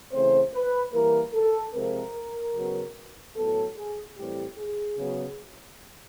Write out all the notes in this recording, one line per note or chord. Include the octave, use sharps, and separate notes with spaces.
C#3 E3 A3 C4 C5
B4
E3 G3 A#3 A#4
A4
C3 F3 G#3 C4 A#4
C#3 F#3 B3
A2 F#3 B3 A4
G#4
A2 E3 G3 C4 G4
G#4
C#3 F#3 B3